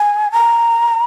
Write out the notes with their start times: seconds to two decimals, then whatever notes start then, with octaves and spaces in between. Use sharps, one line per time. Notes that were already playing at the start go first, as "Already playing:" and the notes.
Already playing: G#5
0.32 A#5